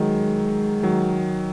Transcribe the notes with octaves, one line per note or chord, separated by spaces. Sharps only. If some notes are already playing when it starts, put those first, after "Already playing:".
Already playing: D#3 F#3 G#3
D#3 F#3